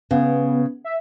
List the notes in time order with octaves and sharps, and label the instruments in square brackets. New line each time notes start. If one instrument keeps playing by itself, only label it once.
[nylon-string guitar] C#3 [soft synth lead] B3
[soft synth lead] E5